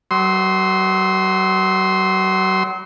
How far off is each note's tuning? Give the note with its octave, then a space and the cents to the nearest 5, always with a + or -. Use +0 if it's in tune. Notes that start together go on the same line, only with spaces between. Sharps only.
F#3 +35 C6 +0 E6 -40